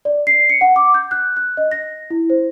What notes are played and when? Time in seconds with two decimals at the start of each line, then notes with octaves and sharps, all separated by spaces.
0.05 D5
0.27 C7
0.50 C#7
0.61 F#5
0.76 D6
0.94 G6
1.11 F#6
1.37 F#6
1.57 D#5
1.71 A#6
2.11 E4
2.30 C5